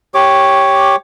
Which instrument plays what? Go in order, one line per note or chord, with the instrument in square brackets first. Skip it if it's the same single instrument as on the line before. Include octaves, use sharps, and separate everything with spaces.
[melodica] G4 C#5 D6